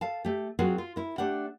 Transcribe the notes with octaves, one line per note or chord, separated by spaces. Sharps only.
A4 F5 A5
A3 G4
F#3 C4 F4 F#4 G#4 A#4
F4
E4 A#4
A3 D4 G4 F#5